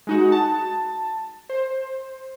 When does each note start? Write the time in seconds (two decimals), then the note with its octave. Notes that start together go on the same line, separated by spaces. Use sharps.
0.07 G#3 D#4 F#4
0.32 A5
1.49 C5